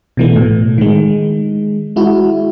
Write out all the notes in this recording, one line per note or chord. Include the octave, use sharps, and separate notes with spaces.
B2 E3 A3
A2
D#3 G#3
G#3 E4 F#4